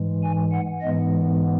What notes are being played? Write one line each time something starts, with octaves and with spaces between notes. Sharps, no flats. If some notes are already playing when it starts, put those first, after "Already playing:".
Already playing: G#2 E3 G#3
G#5
F#5
G#2 E3 G#3 B3 D#5